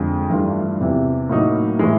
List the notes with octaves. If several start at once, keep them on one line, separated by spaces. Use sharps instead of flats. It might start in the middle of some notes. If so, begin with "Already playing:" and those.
Already playing: F2 D3 F3 G#3
G2 E3 A3 D4 F4
E2 C3 E3
A2 F#3 A#3 D#4
A2 E3 G#3